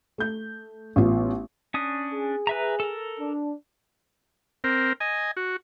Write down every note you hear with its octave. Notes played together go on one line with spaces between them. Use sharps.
A3 G6
A1 B3 F4
C#4 D4 D#6
G#4
B4 E5 A#5
A4 A#4
D4
C4 A#4
D#5 G#5
F#4